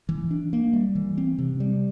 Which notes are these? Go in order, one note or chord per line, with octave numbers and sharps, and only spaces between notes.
E3
D4
A#3
G3
E3
C4
C3
G3